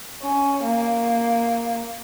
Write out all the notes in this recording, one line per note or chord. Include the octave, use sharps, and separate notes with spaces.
C#4
A#3